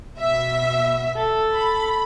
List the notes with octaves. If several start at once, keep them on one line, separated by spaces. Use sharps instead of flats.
B2 E5
A4
B5